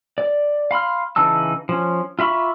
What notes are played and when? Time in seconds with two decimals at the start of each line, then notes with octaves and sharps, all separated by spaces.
0.18 D5
0.71 F5 B5 C6 F6
1.16 C#3 E3 D#4 A5 E6
1.69 F3 C#4
2.19 F4 E5 B5 C#6